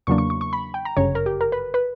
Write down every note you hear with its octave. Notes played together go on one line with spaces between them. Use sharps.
E2 C#3 F#3 A#3 D4 C#6
C#6
C#6
C#6
B5
G5
A#5
G1 F#2 C#3 C#5
A#4
G4
A#4
B4
B4